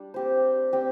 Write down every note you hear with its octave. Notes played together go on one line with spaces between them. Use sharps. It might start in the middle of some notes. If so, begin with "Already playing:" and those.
Already playing: G3 D4
C4 G4 C5
C4 G4 C5